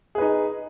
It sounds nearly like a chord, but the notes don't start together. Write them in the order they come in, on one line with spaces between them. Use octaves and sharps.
G#4 B4 D#4